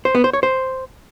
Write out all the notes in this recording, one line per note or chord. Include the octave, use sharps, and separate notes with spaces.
C5
B3
C5
C#5
C5